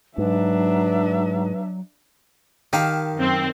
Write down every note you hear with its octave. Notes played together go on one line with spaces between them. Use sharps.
G#2 F#3 D4 B4 E5
D#3 G4 F5 A5
F#2 C4